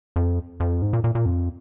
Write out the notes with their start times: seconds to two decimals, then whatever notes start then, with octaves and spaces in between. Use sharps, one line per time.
0.16 F2
0.60 F2
0.82 G#2
0.93 A#2
1.04 A#2
1.15 A#2
1.26 F2